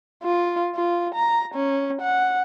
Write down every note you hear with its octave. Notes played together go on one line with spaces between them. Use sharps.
F4
F4
A#5
C#4
F#5